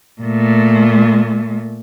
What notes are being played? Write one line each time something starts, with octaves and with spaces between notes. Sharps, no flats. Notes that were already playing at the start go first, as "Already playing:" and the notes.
A#2 A3